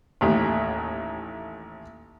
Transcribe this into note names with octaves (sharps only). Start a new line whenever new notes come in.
A1 D#2 A2